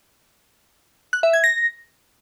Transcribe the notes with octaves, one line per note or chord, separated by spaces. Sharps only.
F#6
E5
G#6
A#6